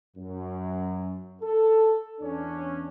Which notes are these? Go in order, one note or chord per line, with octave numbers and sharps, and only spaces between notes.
F#2
A4
E2 C#4 D4